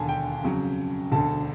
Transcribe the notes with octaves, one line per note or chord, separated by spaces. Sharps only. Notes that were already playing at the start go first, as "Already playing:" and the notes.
Already playing: E1 D#2 D3 G#5 A5
G5
F2 C#3 F#3
E1 D2 D3 A5